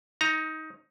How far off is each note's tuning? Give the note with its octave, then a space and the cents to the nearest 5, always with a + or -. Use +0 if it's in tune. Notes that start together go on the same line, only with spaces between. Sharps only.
D#4 +15 A#5 +0